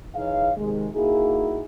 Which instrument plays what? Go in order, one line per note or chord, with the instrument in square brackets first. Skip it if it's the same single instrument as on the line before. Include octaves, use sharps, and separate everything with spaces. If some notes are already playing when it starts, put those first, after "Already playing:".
[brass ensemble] E3 D#4 G#4 C#5 F5
C3 D#3 G#3
A#3 D#4 E4 F#4 G#4